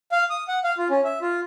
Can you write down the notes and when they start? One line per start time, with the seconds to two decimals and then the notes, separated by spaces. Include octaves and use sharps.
0.12 F5
0.30 D#6
0.48 F#5
0.64 F5
0.78 F4
0.90 C#4
1.04 E5
1.21 F4